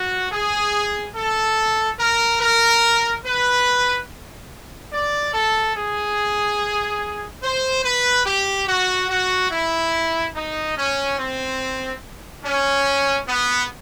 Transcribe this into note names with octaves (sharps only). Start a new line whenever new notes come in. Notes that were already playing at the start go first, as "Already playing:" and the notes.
Already playing: F#4
G#4
A4
A#4
A#4
B4
D5
A4
G#4
C5
B4
G4
F#4
F#4
E4
D#4
C#4
C4
C#4
B3